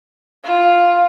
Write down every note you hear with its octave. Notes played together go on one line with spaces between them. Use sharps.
F4